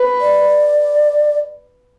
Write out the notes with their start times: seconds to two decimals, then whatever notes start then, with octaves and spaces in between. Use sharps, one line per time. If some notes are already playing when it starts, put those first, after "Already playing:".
Already playing: B4
0.21 D5